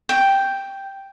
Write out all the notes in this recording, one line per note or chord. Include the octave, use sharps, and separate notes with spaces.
G5